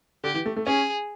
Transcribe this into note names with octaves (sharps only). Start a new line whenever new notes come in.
D3 G4
E3
A3
A3
C#4 G#4